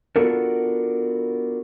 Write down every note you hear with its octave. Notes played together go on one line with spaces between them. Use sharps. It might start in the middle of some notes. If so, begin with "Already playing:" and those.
B3 D4 F4 F#4 A4 A#4